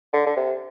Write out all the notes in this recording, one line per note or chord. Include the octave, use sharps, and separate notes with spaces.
D3
D3
C3